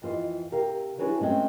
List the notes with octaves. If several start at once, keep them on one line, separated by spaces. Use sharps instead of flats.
F2 E3 F4 C5 D#5
C3 G4 A#4 F5
D4 E4 F#4 G#4 B4 C#5
C3 G#3 A3 C4 C#4